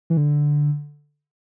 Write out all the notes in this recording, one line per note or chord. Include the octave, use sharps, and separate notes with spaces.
E3
D3